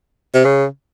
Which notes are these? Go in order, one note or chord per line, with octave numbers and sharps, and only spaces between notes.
C3
C#3